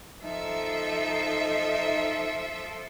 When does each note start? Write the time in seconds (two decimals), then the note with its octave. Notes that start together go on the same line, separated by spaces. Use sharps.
0.24 F3 D#4 A4 E5